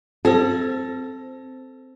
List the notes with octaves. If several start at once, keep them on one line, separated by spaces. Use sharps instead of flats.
C4 A4 C5